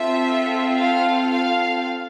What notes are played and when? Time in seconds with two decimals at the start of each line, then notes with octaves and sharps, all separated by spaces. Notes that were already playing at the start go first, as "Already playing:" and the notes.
Already playing: C4 F4 A4 E5
0.77 F5
1.30 F5